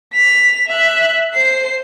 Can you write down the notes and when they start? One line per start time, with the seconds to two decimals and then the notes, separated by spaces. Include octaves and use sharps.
0.13 B6 F7
0.68 E5 F#6
1.33 C5 C7